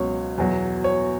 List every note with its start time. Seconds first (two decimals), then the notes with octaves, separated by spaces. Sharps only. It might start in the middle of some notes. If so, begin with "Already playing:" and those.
Already playing: C#2 B2 F#3 C#5
0.38 E2 B2 F#3
0.84 C#5